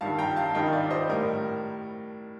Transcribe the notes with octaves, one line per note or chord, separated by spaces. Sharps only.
G2 D#3 G3 F5 A5
G5 A#5
F5 A5
G2 D#3 G3 D#5 G5
D5 F5
C5 D#5
A2 G3 A#4